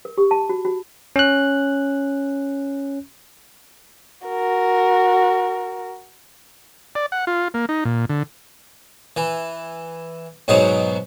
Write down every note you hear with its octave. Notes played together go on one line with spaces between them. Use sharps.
A#4
G4
A5
F#4
F#4
C#4 F#6
F#4 A#4
D5
F#5
F4
A#3
D#4
A#2
D3
E3
G#2 B2 F#3 D#4